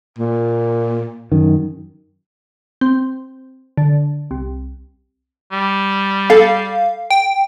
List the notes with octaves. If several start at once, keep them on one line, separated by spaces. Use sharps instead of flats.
A#2
F#2 D#3
C4
D3
C2
G3
A4 F5
G5